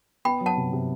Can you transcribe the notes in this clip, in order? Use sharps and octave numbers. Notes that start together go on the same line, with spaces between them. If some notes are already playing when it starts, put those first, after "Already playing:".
B3 G5 B5
F#3
F#5 A5
C3
C3